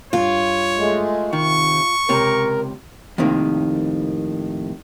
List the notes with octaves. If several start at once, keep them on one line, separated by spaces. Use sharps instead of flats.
E2 G2 F4 C#5
G#3 A3
C3 D#3 C#6
C#2 C3 A#4 C#5
F2 A2 C3 D#3 A#3